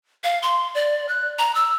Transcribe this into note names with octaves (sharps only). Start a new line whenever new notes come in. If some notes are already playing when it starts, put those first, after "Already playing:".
F5
C6
D5
F#6
A#5
E6